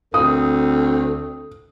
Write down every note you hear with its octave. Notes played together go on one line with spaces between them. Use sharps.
D2 C4 A4 D#6